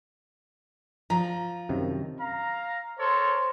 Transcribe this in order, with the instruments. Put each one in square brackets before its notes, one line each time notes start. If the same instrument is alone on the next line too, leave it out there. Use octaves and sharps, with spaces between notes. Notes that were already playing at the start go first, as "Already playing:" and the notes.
[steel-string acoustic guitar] F3 [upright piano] A#5
[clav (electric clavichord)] F#2 C3 D#3
[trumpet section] F5 A#5
[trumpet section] A4 A#4 C#5 [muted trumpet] C5